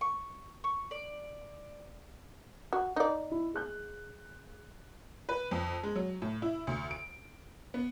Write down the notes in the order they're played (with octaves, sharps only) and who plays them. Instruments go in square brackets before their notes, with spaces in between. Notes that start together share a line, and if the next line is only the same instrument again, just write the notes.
[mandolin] C#6
C#6
D5
[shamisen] F#4
D#4 D5
[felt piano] E4
G#4 F#6 G6
[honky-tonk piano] B4
F2
G#3
F#3
A2
E4
D2
D7
B3